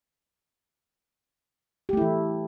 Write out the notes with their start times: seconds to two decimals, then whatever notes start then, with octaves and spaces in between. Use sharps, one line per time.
1.89 G4
1.93 A3
1.97 E4
2.02 E3